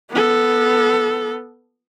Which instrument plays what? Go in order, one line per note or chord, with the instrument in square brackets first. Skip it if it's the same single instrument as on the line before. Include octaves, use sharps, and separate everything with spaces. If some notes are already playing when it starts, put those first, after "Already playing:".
[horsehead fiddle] B3 A4